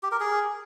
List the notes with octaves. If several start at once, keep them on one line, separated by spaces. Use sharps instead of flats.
G4
A#4
G#4